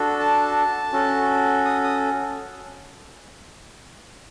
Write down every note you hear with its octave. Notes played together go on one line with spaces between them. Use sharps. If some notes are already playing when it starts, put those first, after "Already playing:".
Already playing: D4 F#4 A4
A5
C#4 F#4 A4
D#6
D#6